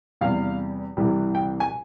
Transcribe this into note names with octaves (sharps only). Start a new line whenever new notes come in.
E2 C3 G3 F5
C2 C3 E3 G3
G5
G#5